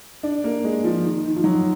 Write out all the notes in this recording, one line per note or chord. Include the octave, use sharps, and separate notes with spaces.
D4
A#3
G#3
F3
D#3
D#3
F3
F#3